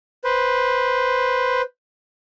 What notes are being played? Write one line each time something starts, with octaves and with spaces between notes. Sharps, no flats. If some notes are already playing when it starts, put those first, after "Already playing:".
B4 C5